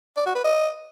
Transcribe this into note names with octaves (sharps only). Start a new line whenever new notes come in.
D5
F#4
B4
D#5